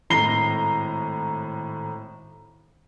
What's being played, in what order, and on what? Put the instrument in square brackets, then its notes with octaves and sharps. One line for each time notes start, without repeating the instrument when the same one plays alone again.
[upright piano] G#1 A2 A#5 A#6 C7 G7